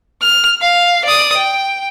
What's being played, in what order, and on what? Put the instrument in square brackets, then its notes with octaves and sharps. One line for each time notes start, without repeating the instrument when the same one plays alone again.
[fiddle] F6
F5
D5 D#6
G5